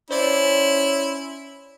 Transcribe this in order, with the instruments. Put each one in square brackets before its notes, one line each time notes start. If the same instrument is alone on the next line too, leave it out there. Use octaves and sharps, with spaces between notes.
[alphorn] C#4 [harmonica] E4 [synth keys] C5 D5